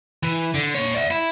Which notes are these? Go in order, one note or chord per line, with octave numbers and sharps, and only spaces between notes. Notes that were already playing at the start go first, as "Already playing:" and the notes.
E3
D3
A#2 C#5
D5 E5
E4